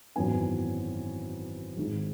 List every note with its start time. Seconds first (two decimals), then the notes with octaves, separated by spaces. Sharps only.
0.16 G#1 F#2 E3 B3 G#5
1.77 G#1 G#2 D#3